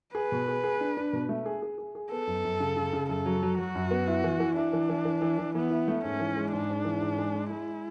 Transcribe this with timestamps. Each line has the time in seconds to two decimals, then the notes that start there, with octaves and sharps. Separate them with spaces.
0.15 G#4 B4
0.32 B2
0.48 G#4
0.64 G#4
0.81 D4
0.97 D4
1.13 B2
1.29 A3
1.46 G#4
1.62 G#4
1.78 G#4
1.95 G#4
2.11 B3 A4
2.27 F#2
2.44 F#2
2.60 C#3
2.77 C#3
2.93 C#3
3.09 F#2 A4
3.26 F#3
3.43 F#3
3.58 F#3 F#4
3.75 F#2
3.91 B3
4.08 E4
4.24 E3
4.40 E3
4.56 D4 E4
4.73 E3
4.90 E3
5.05 E3
5.22 E3
5.38 E3
5.55 E3 B3
5.70 E4
5.88 A3
6.04 G#2 C#4
6.20 E3
6.37 G#3
6.53 G#2 D4
6.69 G#2
6.85 E3
7.01 G#2
7.18 G#3
7.35 G#3
7.51 G#3 E4